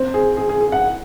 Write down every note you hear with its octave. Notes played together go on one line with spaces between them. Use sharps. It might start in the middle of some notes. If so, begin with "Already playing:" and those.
Already playing: C4
G#4
G#4
G#4
G#4
F#5